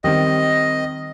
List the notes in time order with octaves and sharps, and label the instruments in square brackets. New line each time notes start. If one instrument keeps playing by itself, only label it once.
[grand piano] D#3 G3 C4 [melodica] D#5